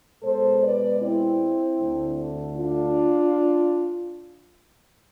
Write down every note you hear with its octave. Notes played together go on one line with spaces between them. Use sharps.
B2 G#3 A4 C5
B4 D5
C4 E4
D2 D3 A3
D4 F4